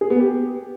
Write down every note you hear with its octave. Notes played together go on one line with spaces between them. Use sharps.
G#4
B3
G4